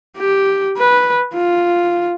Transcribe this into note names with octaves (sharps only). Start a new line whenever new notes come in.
G4
B4
F4